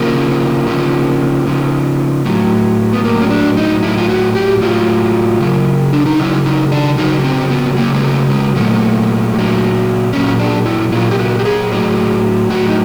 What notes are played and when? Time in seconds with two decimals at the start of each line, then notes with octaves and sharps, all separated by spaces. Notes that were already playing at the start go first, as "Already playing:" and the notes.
Already playing: C#3 F3 A#3
0.67 C#3 F3
1.47 C#3 F3
2.25 A2 F#3
2.93 B3
3.04 A2 F#3 A#3
3.22 C#4
3.30 D4
3.57 D#4
3.83 A2 F#3 E4
3.98 F4
4.09 F#4
4.35 G4
4.62 A2 F#3 F4
5.41 C#3 F#3
5.93 D4
6.06 D#4
6.19 C#3 F#3 E4
6.46 D#4
6.72 D4
6.98 C#3 F#3 D#4
7.24 C4
7.50 B3
7.77 C#3 F#3 A#3
7.94 G#3
8.03 A3
8.30 G#3
8.56 A#2 F#3 A3
9.34 A#2 F#3
10.13 A#2 F#3 C#4
10.40 D4
10.65 E4
10.92 A#2 F#3 F4
11.11 G4
11.19 F#4
11.39 G4
11.45 G#4
11.71 A2 F#3
12.50 A2 F#3 F#4
12.69 D#4